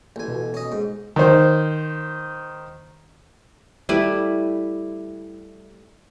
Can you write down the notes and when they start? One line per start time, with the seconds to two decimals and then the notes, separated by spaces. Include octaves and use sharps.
0.16 A1 G#5
0.28 B2
0.54 C#4 D#5
0.72 G#2
1.16 D#3 C5
3.89 G3 A3 E4 B4